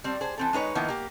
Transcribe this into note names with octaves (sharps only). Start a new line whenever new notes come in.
G3 C4
G#4 C5
E3 C4 A4
G#3 D#4 B4 C#5
D#3 F3 A#3 B3 D#4 E4
A#3 G4